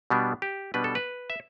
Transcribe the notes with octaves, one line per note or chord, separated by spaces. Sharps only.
B2 G3 B3 D4
G4
B2 G3 B3 D4 B4
A4
B4
E5